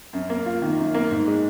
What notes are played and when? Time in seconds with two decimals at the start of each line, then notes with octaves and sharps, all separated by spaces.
0.13 F#2
0.30 A#3
0.46 F4
0.62 D#3
0.79 F#2
0.94 A#3
1.11 G#2
1.27 G#3